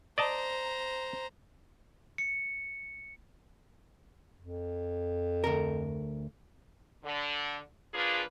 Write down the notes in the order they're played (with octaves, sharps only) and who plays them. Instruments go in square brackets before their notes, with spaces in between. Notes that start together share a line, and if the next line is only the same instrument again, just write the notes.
[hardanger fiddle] C5 A#5 [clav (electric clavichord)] D5 D#5 A5
[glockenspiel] C#7
[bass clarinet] F2
[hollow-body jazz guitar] D2 A4 A#4
[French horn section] D3
F3 A#3 D4 F4 G#4 B4